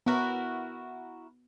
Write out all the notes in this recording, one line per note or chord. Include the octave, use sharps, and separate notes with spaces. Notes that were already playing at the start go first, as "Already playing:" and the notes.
B3 E4 F#4 A#4